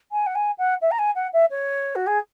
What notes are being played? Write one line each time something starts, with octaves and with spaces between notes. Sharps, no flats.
G#5
F#5
G#5
F#5
E5
A#5
G#5
F#5
E5
C#5
F#4
G#4